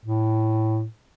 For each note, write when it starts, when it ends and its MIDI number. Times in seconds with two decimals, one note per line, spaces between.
0.05 0.85 45